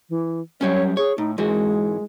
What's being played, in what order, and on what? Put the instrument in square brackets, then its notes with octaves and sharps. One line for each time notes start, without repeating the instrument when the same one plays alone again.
[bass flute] E3
[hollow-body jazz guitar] F#3 G3 C#4 [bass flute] C#5
[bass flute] G#4 [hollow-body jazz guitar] C#5
[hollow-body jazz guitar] A2 [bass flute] D#4
[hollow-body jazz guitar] G#2 E3 F#4 [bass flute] G#3